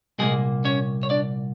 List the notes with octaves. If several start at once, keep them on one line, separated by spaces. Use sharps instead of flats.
C2 A#2 G3 G#3 A#3 G#4
C#4 C#5
C#5
D4 D5